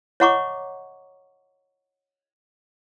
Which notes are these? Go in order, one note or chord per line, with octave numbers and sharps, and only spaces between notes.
C#5 D#5 F#5 A#5 C#6 D6